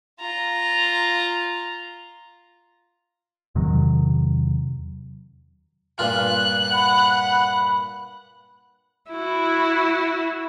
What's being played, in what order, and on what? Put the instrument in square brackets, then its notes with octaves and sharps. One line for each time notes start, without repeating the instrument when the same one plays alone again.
[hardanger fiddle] F4 A#5
[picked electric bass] E2 C3 D#3 F#3
[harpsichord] G2 A#2 F4 [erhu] F#6
[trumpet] F#5 [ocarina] B5
[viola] E4 F#4